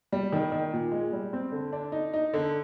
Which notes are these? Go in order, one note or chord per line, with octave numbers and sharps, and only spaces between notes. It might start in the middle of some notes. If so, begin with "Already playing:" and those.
G3
D#3
D#3
A#2
G#3
G3
C4
D3
D4
D#4
D#4
D3